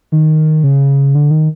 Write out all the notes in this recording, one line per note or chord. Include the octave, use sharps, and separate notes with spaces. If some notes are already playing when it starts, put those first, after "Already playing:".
D#3
C#3
D3
D#3